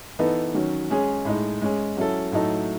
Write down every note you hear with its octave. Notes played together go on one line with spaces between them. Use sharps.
E3 B3 D#4 A4
D#3 F#3 C#4
G#3 C#4 G#4
A2 G#3 D#4
G#3 C#4 G#4
F#3 C#4 E4 A4
A2 F#3 A3 D#4 A4